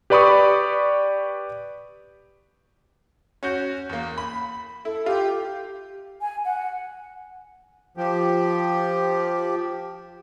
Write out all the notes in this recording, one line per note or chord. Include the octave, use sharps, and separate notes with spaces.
G4 B4 D5 B5 C#6 D#6
C#4 F#4 G6
E2 A#3
B5
E4 A4
F4 G4
G#5
F#5
F3 G4